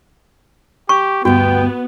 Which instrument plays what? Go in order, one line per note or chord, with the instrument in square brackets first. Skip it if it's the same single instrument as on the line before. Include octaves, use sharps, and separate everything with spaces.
[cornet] G4 [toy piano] C#6
[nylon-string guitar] D2 G2 [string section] B3 [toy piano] F#4 [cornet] G5